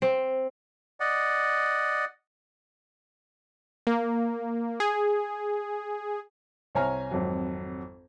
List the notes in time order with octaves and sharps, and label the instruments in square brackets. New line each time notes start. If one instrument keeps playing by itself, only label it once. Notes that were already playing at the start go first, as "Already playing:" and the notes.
[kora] C4
[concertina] D5 D#5 F#5
[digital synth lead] A#3
G#4
[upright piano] C2 C5 C#5 G#5 A#5 F6
G#1 F2 F#3